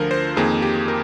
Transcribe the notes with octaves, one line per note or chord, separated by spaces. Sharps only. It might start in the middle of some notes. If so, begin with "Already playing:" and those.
Already playing: D2 D3 F3 A#4
C5
F2 D#3 A#3 G#4
G4
A#4